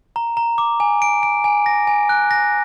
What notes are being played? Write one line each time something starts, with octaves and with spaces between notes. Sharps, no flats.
A#5
A#5
D6
G#5
D7
D7
G#5
A#6
G#5
F#6
A#6